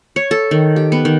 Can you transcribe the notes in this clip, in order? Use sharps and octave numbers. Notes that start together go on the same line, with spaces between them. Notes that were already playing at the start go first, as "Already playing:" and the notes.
C#5
A4
D#3
G4
B3
D#3